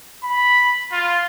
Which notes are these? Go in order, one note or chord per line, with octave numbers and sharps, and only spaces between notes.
B5
F4